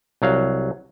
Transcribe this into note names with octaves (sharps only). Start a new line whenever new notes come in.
C2 F#3 F5